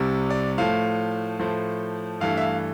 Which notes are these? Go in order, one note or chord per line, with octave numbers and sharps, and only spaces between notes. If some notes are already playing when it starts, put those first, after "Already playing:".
Already playing: C2 C3 G3
D5
A2 F3 A3 F5
A2 F3 A3
G2 E3 A3 F5
E5
F5